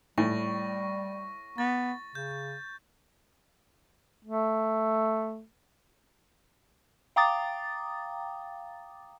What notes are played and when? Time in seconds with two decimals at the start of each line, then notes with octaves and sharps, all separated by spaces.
0.18 A2 G3 C#6 A#6
1.58 B3 A6
2.15 C#3 G6
4.25 A3
7.16 F5 G5 A#5 D6 D#6 A6